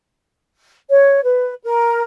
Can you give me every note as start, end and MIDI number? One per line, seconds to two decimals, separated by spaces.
0.90 1.21 73
1.24 1.54 71
1.64 2.03 70